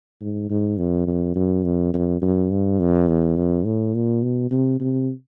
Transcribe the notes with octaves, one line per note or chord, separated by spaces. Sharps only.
G#2
G#2
F2
F2
F#2
F2
F2
F#2
G2
F2
E2
F2
A2
A#2
B2
C3
C3